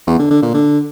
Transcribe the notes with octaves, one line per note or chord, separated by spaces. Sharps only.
E2
D3
D3
A#2
D3